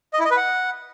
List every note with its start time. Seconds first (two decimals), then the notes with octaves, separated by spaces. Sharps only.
0.14 D#5
0.19 E4
0.25 D#5
0.31 B4
0.37 F#5